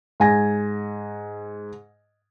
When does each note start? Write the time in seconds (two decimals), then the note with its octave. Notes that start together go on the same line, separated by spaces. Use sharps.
0.20 G#2 G#5 A#6